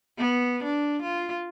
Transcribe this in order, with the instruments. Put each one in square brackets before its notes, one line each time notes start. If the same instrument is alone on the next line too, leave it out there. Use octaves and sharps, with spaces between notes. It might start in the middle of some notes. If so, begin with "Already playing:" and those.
[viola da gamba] B3
D4
F4